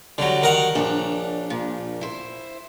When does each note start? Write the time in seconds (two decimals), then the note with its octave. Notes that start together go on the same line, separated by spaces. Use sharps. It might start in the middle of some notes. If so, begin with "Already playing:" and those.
0.18 D3 F#3 G3 F#4
0.42 D#3 A#4 F#5
0.75 A#1 D4 C#5
1.50 A#2
2.01 E4 C5